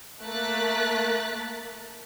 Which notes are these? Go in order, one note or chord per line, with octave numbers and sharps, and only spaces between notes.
A3 A#3 A#4 F#6 A6 B6